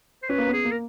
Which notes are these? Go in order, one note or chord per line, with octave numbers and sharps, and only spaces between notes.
C5
C#4 B4
A#3
B3
G#4
A#3
A#4